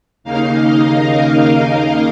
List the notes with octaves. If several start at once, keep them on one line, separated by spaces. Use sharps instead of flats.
D#2 C#3 A#3 D#4 F5
D#5
A#4